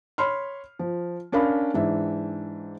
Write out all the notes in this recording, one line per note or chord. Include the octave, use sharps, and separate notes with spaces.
C#5 B5 C6 F6
F3
C#4 D4 A#4 F5 B5
G#2 E3 D4 E5